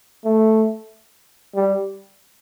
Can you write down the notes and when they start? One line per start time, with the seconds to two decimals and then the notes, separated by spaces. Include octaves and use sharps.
0.24 A3
1.55 G3